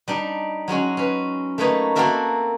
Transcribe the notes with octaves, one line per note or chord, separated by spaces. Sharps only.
G3 D4 D#4
F#3 G#3 C#4 F#4
C#4 B4
A3 A#3 D#4 B4 C#5 D#5
A#3 C4 F#4 A4 A#4 E5